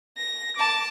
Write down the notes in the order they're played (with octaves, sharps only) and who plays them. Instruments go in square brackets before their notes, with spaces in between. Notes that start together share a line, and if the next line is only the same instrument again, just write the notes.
[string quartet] A#6
A5 D6